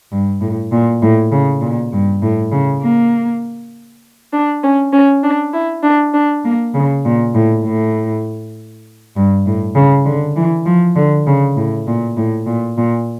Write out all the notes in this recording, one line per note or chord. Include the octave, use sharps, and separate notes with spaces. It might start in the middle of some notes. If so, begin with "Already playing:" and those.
G2
A2
A#2
A2
C#3
A#2
G2
A2
C#3
A#3
D4
C#4
C#4
D4
E4
D4
D4
A#3
C#3
A#2
A2
A2
G2
A2
C#3
D3
E3
F3
D3
C#3
A2
A#2
A2
A#2
A#2